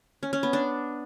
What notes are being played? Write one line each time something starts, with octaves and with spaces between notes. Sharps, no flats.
C#4
C#4
B3
D4